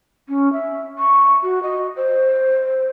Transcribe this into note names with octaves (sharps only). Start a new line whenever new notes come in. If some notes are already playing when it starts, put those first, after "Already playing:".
C#4
E5
C#6
F#4
D#5
C5